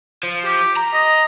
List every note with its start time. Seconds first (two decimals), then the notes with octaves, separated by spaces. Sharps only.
0.23 F3
0.45 G4
0.76 A#5
0.93 D#5